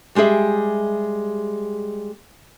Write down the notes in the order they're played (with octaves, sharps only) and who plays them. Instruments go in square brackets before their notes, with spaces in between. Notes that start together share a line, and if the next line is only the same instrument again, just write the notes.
[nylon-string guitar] G3 G#3 G4 G#4 E5